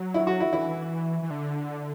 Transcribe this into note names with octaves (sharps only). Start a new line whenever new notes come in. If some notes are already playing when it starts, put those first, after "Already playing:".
Already playing: F#3
E4
F#4
E4
E3 E4
E3
D3